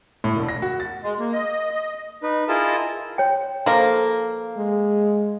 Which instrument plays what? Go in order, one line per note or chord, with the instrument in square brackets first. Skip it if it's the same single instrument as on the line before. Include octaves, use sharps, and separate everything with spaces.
[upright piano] A2
E1
A#6
F#4
A6
[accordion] G#3
A#3
D#5
D#5
[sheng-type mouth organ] D#4 B4
E4 F4 G#4 A#4 D#5 A5
[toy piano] C#5 G5
[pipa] F3 A#3 [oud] A4 C5
[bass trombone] G#3